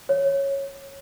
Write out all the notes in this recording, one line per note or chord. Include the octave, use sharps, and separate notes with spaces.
C#5